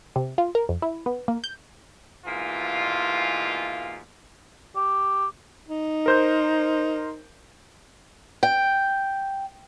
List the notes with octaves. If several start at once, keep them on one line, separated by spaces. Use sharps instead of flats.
C3
F4
A#4
F2
E4
B3
A#3
G6
G#2 B2 E3 A#3 F4
G4
D#4
A#4 C5 G6
G5